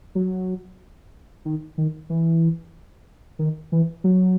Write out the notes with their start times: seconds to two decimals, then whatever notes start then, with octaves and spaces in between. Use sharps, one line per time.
0.15 F#3
1.45 D#3
1.78 D#3
2.10 E3
3.39 D#3
3.72 E3
4.04 F#3